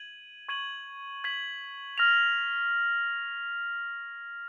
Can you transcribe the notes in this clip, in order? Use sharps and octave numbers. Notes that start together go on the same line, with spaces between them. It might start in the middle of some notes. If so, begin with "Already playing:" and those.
Already playing: G#6 D#7 F#7
C#6 G#6 D#7 F#7
G#6 B6 F#7
F6 A#6 F7